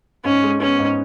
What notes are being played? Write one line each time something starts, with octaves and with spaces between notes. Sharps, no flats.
G#2 C#4
G#3
B3 C#4
G#2